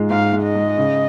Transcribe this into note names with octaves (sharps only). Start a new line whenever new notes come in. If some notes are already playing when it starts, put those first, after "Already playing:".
Already playing: G#2 G#3 F4
G#2 F5
G#2
D#5
G#3
C#3